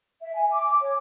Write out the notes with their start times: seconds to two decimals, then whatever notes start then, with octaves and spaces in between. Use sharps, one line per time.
0.22 E5
0.34 G#5
0.53 D6
0.80 C#5